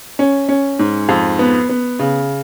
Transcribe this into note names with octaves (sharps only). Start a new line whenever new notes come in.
C#4
C#4
G#2
F2
B3
B3
C#3